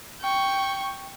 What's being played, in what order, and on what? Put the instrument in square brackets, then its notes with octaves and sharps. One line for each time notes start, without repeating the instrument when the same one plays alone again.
[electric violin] G5 C#6